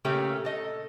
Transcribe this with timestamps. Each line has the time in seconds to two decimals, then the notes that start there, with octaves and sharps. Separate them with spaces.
0.05 A#2 C#3 A3 C#4 G4
0.45 A4 D#5